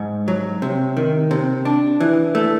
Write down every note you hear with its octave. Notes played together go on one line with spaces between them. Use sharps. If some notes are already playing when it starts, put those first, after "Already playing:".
Already playing: G#2
F#3
C3
D#3
C3
D4
E3
A3